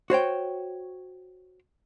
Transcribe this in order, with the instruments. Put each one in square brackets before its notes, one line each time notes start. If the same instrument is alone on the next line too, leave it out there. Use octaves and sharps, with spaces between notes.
[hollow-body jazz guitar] F#4 C5 C#5 G5